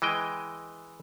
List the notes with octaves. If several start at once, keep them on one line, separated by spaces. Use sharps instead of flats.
E3 G#3 D#5 G5